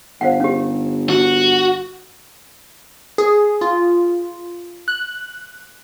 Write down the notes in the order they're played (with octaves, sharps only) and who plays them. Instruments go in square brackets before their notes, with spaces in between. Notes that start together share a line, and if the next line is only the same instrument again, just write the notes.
[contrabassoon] G1 [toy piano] C5 F5 F#5
[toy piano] C#4 G4
[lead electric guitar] F#4
[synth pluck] G#4
F4
F#6